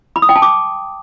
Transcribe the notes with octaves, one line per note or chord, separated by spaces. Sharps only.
B5
D#6
G5
A5
D6